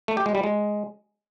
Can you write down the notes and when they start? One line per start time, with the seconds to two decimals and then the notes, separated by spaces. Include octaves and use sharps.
0.08 A3
0.17 G4
0.26 G#3
0.35 G3
0.43 G#3